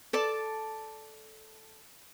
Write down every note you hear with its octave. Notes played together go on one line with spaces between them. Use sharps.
A4 D5 A5